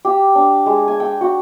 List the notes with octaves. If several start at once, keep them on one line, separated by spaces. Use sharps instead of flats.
G4
D4
G#3
G#5
G5
F#4